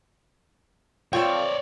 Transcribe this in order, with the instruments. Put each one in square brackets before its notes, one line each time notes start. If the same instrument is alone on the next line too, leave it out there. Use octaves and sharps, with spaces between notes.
[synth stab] C4 F4 A4 [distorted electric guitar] C#5 D5 [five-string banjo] G5